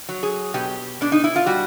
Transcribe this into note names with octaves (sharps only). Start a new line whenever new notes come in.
F#3
G#4
B2 G4
B2 D4
D#4
E4
F4
G3 F#4